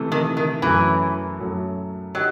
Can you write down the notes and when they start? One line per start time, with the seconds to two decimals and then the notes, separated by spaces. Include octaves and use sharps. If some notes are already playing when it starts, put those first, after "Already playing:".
Already playing: C3 E3 A3
0.12 D#3
0.37 D#3
0.62 F#2 E3 F#3 A3
1.39 F#2 F#3 A3
2.15 F#3 D#4 G4